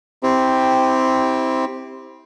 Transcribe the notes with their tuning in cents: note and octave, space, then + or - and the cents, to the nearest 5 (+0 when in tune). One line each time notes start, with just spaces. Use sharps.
C4 +0 E4 -30 G4 +0